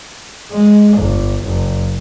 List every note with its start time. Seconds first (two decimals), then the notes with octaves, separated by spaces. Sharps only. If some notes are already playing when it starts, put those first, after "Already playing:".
0.52 G#3
0.98 G1
1.44 F#1